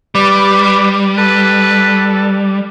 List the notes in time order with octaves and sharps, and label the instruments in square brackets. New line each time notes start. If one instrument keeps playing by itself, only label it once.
[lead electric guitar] G3 [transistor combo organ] B4 D5
[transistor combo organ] A4 [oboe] B4